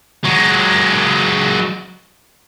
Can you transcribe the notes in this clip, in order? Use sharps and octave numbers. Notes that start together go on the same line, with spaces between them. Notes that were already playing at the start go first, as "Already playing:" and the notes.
F#3 G#3